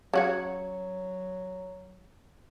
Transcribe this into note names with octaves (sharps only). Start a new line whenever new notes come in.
C#3 F#3 F#4 C#5